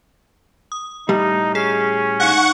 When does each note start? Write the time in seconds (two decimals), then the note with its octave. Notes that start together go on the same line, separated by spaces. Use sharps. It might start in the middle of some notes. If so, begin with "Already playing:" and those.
0.72 D#6
1.09 A2 G3 D#4
1.55 C#4 G#4 C7
2.20 D#4 F5 F#5 C#6